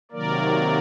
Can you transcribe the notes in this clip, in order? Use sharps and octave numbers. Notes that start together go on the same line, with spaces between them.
C3 D#3 F#3 A#3 A#4 D5